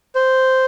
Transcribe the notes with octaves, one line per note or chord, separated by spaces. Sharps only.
C5